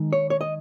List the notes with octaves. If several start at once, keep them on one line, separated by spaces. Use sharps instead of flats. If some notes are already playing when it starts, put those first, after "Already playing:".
Already playing: D#3 G#3 D#4
C#5
C#5
D#5